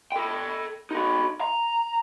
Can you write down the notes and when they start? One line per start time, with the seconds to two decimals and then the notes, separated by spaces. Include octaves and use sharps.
0.12 A4 G5
0.91 D#4 F#4
1.41 A#5